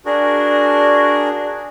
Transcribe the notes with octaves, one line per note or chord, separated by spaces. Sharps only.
D4 F#4 G#4 A#4